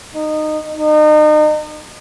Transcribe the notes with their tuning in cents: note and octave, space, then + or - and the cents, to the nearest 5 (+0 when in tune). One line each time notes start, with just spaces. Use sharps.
D#4 -20
D#4 -35